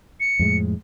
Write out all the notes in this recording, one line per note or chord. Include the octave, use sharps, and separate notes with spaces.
C#7
F2 A2 G#3